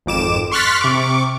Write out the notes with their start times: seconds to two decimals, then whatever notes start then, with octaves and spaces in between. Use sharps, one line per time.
0.06 G#1 F2 D6 E7
0.51 C6 C#6 F6 F#6 A6 B6
0.81 C3 C#6 D6